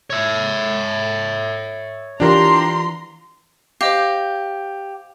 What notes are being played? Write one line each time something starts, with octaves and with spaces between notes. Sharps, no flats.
C#5 E5
E3 D4 F4 G4 A#4 A#5 C6
G4 C5 D#5 F5